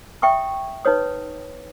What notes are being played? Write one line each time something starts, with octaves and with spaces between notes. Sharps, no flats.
E5 G5 C#6 D#6
D#4 B4 C#5 D#6